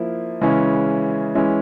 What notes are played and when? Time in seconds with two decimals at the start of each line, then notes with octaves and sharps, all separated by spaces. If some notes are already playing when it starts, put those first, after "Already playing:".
Already playing: F3 A#3 E4
0.41 C#3 E3 G#3 C#4 E4
1.35 E3 G#3 C#4 E4